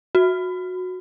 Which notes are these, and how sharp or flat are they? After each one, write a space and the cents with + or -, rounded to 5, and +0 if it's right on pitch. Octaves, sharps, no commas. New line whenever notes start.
F#4 -15